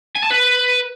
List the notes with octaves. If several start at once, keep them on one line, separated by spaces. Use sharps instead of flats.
G#5
A5
B4